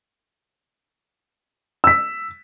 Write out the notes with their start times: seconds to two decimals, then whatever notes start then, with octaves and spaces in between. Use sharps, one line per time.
1.84 E6 B6